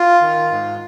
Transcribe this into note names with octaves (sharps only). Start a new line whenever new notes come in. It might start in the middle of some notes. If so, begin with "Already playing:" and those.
Already playing: F4
D#3
G#2